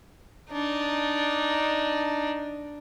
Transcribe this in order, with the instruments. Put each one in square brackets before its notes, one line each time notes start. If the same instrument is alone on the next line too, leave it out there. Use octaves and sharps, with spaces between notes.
[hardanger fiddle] D4 D#4